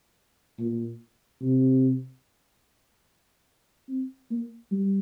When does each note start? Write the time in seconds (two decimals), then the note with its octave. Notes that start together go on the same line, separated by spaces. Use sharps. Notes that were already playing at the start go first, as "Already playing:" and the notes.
0.59 A#2
1.41 C3
3.89 C4
4.30 A#3
4.71 G3